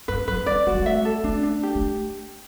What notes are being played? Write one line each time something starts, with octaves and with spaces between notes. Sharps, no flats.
G2 B4
F#3 B4
G3 D5
A3 F#4
G3
A3 E5
A4
A3 D4
D4
G4
A3